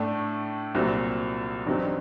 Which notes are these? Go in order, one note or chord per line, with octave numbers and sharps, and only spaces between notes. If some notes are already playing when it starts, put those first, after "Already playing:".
Already playing: A2 A3 D4
C2 A#2 F#3 C4
A1 G2 F#3 C4 D#4